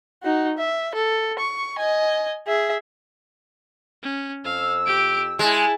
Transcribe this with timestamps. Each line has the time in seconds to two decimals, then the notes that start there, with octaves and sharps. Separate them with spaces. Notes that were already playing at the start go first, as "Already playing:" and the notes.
0.23 D#4 F#4
0.58 E5
0.95 A4
1.39 C#6
1.79 D#5 G#5
2.47 G#4 E5
4.03 C#4
4.44 F2 F5 E6
4.86 G4 D7
5.39 G#3 E4 A5